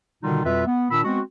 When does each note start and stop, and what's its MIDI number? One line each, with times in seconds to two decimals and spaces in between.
0.23 0.45 47
0.23 0.45 50
0.23 0.45 51
0.23 0.45 55
0.23 0.45 63
0.23 0.45 65
0.45 0.64 41
0.45 0.64 47
0.45 0.64 55
0.45 0.64 65
0.45 0.64 71
0.45 0.64 76
0.66 0.87 59
0.91 1.01 46
0.91 1.01 51
0.91 1.01 62
0.91 1.01 83
0.91 1.01 88
1.04 1.19 56
1.04 1.19 59
1.04 1.19 60
1.04 1.19 66